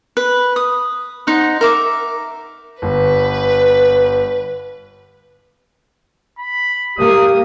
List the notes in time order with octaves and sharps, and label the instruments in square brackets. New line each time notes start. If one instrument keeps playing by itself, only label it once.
[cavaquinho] B4
D#6
D#4 C5 F#5
A#4 E5 D6
[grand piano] G1 [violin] B4
[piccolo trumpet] B5
[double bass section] A#3 [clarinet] G4 [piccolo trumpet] D#6